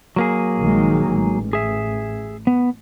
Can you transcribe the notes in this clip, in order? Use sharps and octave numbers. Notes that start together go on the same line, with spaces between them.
F#3 A#3 G#4
A#1 D#3 G#3
A1
G#4 E5
B3